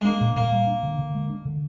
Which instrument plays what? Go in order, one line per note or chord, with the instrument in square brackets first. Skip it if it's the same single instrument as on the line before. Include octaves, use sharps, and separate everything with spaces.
[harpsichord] G#3
[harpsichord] A#3 [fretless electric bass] D4
[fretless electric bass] A#2
[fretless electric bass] A#2 [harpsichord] A#3
[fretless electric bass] G3
D4
D3
D3
G#3
D4
D3